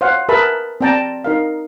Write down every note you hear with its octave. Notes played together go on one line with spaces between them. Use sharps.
C5 C#5 F5 F#5
G#4 A#4 B4 E5 A5 B5
C4 D5 G5 A5 A#5
D#4 A#4 F5